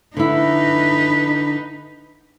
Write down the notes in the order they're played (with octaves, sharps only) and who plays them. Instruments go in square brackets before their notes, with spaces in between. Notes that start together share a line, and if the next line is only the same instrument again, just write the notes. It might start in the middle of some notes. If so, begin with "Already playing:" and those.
[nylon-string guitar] D3 E4 [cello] D#4 B4